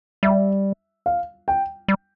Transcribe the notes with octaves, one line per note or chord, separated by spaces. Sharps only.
G3 E5
F5
G5
G3